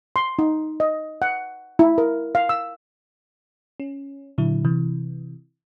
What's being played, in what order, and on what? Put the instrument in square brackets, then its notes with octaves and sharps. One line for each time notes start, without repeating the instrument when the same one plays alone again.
[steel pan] C6
D#4
D#5
F#5
E4
A#4
F5
E6
[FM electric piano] C#4
A#2 D3 F#3 E4
C3 E3